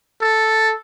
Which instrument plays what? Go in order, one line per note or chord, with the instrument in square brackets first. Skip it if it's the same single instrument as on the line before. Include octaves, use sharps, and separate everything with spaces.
[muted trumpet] A4